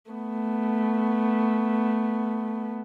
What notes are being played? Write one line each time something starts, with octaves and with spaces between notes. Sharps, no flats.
A3 B3